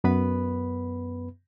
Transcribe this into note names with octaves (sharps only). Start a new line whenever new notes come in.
F#2 B3 B4 B5